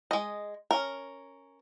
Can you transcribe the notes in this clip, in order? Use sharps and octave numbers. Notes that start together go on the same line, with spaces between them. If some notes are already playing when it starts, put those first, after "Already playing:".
G#3 D#5
C#4 A#4